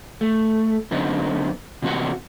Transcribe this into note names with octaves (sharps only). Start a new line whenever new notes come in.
A3
F#2 D3 B3 C4 D#4
C3 E3 C4 C#4 F#4 F#5